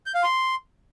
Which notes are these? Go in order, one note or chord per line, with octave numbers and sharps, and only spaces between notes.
G6
F5
C6